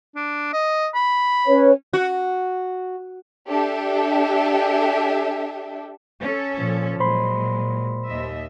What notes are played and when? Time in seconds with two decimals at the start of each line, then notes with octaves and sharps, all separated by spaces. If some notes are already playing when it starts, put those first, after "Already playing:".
0.16 D4
0.53 D#5
0.95 B5
1.47 C#4 B4 C#5
1.93 F#4
3.49 D4 G4 A4 E5
6.20 C#4 A4
6.57 A#2 F3
7.00 A#2 F#3 G#3 C5 B5 C6
8.05 D#2 D#5 E5